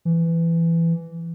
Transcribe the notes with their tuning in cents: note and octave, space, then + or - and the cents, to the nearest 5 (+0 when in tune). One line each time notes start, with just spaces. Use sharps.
E3 +15